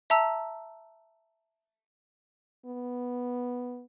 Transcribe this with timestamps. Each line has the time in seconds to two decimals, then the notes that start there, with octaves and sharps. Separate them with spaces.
0.10 E5 A5 A#5 E6
2.66 B3